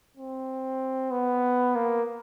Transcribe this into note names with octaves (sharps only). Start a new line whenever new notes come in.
C4
B3
A#3